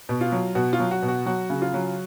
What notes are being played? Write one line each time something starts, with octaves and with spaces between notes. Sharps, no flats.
B2
F4
F#3
B2 F#4
F4
F#3
F#4
B2
F#4
F#3 F#4
C#3
F4
F#3